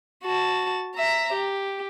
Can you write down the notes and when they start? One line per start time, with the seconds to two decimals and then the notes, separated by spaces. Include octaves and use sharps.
0.24 F#4 A5
0.97 E5 A#5
1.33 G4